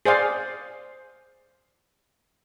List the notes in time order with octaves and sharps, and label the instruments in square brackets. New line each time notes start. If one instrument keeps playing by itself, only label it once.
[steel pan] G#4 C5 D5 F5